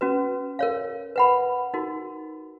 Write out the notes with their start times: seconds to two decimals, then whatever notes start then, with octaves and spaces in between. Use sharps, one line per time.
0.01 C#4 F#4 B4
0.59 A#4 C#5 F5
1.16 B4 F#5 B5
1.74 D#4 F#4 A#4